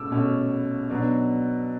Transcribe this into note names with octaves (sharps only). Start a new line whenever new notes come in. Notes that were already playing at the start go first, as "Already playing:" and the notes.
Already playing: B2 A3 C#4 D6 E6
B2 A3 C#4
B2 F#3 B3 D4